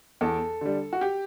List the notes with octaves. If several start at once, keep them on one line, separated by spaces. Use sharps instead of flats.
E2 A4
D3 G3
F#4
G4